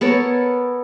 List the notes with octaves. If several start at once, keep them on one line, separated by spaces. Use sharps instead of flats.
B3 A4 A#4 C#5